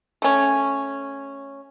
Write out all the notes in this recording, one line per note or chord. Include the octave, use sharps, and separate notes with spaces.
A3 C#4